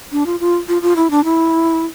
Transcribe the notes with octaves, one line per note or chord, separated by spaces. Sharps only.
D4
F4
F4
F4
F4
E4
D4
E4